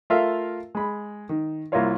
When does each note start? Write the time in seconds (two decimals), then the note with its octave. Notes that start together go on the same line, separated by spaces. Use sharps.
0.10 A3 F4 A4 A#4 E5 F5
0.75 G#3 B5
1.29 D#3
1.72 C2 A#3 E4 F4 C#5 F5